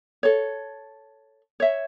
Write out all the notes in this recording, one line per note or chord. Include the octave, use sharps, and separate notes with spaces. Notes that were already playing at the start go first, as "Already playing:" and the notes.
A4 C#5
C#5 E5